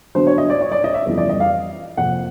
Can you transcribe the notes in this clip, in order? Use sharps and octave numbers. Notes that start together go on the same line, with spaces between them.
D3 F#3 B3 D4 C5
C#5
D#5
D5
C#5
D5
D#5
E5
F2 C#3 E3 G3 B3
D5
D#5
F5
F2 C3 F3 A#3 F#5